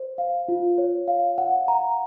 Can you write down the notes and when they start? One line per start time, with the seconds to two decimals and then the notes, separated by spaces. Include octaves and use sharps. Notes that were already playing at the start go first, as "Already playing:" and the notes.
Already playing: C5
0.18 F5
0.48 F4
0.78 C#5
1.08 F5
1.38 F#5
1.68 A#5